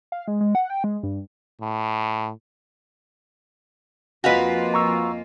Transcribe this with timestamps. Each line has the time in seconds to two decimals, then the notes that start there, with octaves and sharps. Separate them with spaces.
0.12 F5
0.28 G#3
0.41 G#3
0.55 F#5
0.70 G5
0.84 G#3
1.03 G2
1.61 A2
4.24 F2 A#3 F4 F#4 B4 D#5 F5 G#5
4.74 A#5 C#6 E6